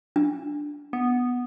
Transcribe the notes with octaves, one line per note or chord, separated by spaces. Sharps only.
D4
B3